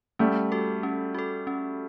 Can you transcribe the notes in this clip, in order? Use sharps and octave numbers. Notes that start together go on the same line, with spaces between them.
G3 A3 C#4
F#4 A4
C#4
F#4 A4
C#4